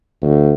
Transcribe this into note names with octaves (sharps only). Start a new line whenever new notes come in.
D2